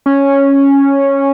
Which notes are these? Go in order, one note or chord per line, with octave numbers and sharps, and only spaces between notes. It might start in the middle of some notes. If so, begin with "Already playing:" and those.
C#4